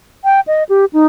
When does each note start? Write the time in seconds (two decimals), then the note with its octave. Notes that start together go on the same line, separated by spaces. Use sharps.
0.24 G5
0.47 D#5
0.69 G4
0.93 D#4